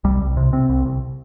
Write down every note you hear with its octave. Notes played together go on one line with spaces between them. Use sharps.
C2 G3
C2
C3
C3 C4
C2
C2